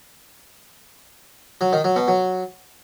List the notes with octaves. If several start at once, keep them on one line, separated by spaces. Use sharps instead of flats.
F#3
D#3
F#3
B2
F#3